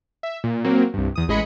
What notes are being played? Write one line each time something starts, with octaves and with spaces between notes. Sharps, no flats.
E5
A#2
F#3 A#3 C4
C2 G2
E2 D#6
A1 G#3 G#4 D#5 B5 C#7